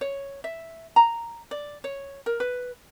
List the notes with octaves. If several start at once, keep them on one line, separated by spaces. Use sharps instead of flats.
C#5
E5
A#5
D5
C#5
A#4
B4